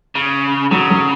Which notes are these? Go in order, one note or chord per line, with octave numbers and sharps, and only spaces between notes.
C#3
C#3 F#3
F#3